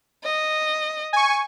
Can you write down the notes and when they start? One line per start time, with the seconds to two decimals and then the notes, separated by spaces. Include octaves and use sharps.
0.24 D#5
1.13 G#5 C#6